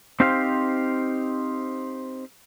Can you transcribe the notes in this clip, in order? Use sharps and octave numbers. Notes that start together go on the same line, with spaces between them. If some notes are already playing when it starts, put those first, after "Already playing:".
C4 D#4 G4 C5 F5